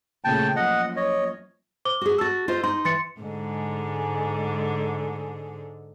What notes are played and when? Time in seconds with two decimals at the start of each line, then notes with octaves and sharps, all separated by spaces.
0.24 A#2 C#3 A3 G5 A5
0.56 F#2 F3 A#3 D#5 F#5
0.96 C#5 D#5
1.85 C5 D6 G7
2.01 F#4 G#4
2.18 F#4 A5 E6 A6
2.48 F4 C5 D#5
2.64 D#4 C6
2.85 E3 C6 A6 C#7
3.20 G#2 D3 G#3